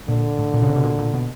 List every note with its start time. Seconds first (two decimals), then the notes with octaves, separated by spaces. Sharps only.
0.08 A#2 D3
0.39 A2
0.54 A#2
0.62 C#3
0.69 C3
0.76 B2
0.84 A#2
0.99 A#2
1.14 B2